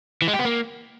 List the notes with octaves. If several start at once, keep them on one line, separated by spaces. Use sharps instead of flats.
E3
G#3
G4
B3
A#3